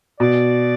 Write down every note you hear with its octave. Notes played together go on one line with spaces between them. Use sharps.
B2 D5